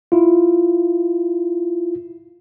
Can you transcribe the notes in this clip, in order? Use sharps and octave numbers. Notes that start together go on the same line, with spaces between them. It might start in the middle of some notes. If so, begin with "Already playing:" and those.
E4 F4